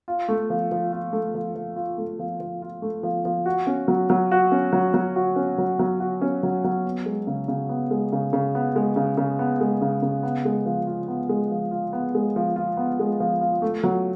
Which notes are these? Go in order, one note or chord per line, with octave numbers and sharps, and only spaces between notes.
F4
A3
F3
F3
F4
A3
F3
F3
F4
A3
F3
F3
F4
A3
F3
F3
F#4
C#4
F#3
F#3
F#4
C#4
F#3
F#3
F#4
C#4
F#3
F#3
F#4
C#4
F#3
F#3
B3
G#3
C#3
C#3
B3
G#3
C#3
C#3
B3
G#3
C#3
C#3
B3
G#3
C#3
C#3
B3
G#3
F3
F4
B3
G#3
F3
F4
B3
G#3
F3
F4
B3
G#3
F3
F4
A3
F#3